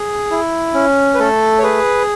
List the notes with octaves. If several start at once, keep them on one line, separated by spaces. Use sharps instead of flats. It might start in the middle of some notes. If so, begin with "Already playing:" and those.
Already playing: G#4
E4
C#4
B4
A3 A4
C#5
G#4 B4